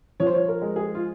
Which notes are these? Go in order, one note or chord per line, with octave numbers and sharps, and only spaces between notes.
F3 C#5
C5
C#5
A#4
G#3
G#4
F4